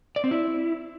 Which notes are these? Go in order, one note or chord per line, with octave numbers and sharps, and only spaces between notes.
D5
C4
E4